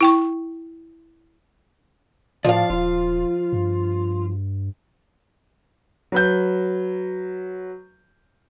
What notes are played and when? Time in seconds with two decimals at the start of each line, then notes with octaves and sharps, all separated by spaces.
0.01 E4 G5 C#6
2.45 A2 F3 D5 F5
2.70 D#1 F4
3.53 G2
6.12 F#3 B4 G6